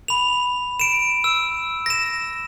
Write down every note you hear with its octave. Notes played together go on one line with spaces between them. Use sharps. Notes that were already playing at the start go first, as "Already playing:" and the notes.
B5 F7
D7 E7
E6
A#6 E7